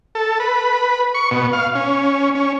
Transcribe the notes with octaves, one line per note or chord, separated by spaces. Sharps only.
A4
B4
C#6
B2
F5
C#4
C#4